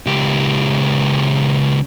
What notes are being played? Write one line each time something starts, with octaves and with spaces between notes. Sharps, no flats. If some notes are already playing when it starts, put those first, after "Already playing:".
C#2 G4